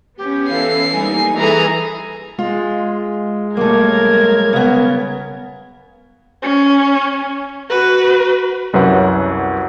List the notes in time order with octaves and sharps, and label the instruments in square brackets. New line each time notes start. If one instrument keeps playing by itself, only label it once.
[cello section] B3 C#4 [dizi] G4
[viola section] E3 A4 [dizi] F5 [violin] C7
[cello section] G3 A#3 D#4 [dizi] G#5
[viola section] E3 A4 [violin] G#4 A#5
[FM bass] G#3 [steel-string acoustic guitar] F4
[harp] B1 G3 [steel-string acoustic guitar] A3 A#3 [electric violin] A#4 G#6
[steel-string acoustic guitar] C#3 B3
[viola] C#4
F#4 B4
[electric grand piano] C2 F#2 F#3 B4 F#5